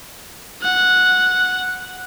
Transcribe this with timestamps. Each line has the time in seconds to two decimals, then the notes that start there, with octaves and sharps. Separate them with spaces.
0.62 F#5